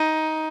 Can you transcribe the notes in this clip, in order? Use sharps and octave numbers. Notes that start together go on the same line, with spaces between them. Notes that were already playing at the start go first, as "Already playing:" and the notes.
Already playing: D#4